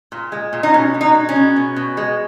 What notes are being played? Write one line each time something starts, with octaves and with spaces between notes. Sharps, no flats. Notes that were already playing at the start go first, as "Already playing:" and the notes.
A#2
G#3
A#2
D#4
B2 C#4
B2
D#4
G#3
C#4
B2
B2
B2
G#3